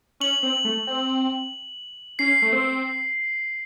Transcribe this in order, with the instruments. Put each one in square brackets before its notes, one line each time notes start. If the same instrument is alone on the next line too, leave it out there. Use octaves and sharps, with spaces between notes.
[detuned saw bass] C#4 [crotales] F#7
[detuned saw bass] C4
A3
C4
[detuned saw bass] C#4 [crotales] C7
[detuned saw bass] A3
C4